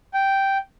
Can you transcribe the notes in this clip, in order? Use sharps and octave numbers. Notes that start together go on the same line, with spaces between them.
G5